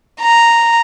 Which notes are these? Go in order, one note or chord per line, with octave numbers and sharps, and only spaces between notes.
A#5